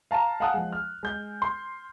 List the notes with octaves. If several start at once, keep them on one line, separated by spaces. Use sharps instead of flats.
F5 A5 A#5
F5 F#5 G#5 A5 D#6 F#6
F3 G#3
F6
G#3 G6
C6